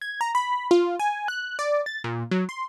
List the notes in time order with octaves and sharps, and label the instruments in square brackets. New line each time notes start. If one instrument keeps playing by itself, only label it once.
[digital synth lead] G#6
A#5
B5
F4
G#5
F#6
D5
A6
A#2
F#3
C6